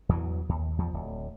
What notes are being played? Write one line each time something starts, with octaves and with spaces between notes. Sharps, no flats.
E2 E3 F#3
D#2
E2 F3
D1